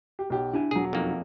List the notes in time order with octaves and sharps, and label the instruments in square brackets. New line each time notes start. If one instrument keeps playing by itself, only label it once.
[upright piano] G4
B1 G4
[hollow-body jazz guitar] D4 G4 G#5 [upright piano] E4
[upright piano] E1 F#3 [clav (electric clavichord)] G#4
[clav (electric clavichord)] F2 A#3 [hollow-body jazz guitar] D#4 F#4 A4